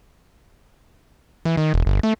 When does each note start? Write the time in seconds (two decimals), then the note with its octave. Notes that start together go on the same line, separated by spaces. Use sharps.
1.45 E3
1.57 D#3
1.74 E1
1.86 G1
2.03 A3